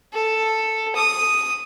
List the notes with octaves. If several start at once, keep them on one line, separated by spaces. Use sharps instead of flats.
A4
D#6